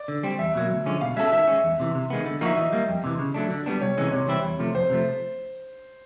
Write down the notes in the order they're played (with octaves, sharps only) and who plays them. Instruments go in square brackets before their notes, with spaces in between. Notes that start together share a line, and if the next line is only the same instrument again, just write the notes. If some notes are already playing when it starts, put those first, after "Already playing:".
Already playing: [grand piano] D5
[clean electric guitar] D3
G3 C4
[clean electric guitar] E2 [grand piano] E5
[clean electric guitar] B2 F#3 A#3
D2
D3 F3 G#3 C#4
[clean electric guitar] B2 [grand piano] F5
[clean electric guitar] G#3 C#4 F#4 A4 [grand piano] E5
[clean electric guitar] D#3 [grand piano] E5
[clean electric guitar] G#3 C#4
E2
C3 E3
C3
D#3 G#3 B3
D3
[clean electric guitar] F3 A#3 D#4 F#4 [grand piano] E5
[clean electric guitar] E3 [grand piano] D#5
[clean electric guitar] G3 A#3
F2
C3 E3
C#3
F#3 A3 D4
D3
G3 B3 D4
[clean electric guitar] C2 [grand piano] C#5
[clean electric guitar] C3 E3 G#3 C#4
[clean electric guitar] C3 [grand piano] C#5
[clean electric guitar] E3 G3 C4 E4
E2
C3 F3 A3
[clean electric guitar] F2 [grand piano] C5
[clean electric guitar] C3 F3 A3